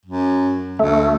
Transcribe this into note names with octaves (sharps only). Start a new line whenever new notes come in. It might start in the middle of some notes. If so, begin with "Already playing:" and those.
F#2
D2 A3